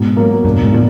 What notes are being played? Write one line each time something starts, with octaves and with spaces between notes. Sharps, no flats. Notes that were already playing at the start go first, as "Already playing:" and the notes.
Already playing: G#2 B2
F#3 A#3
E1 G2
G#2
A2 D3 F3 A3